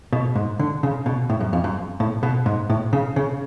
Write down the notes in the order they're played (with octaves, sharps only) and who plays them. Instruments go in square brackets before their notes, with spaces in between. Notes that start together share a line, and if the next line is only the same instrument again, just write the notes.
[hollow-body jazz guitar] B2
G#2
D3
C#3
B2
A2
F#2
F2
F#2
A2
B2
G#2
A2
C#3
C#3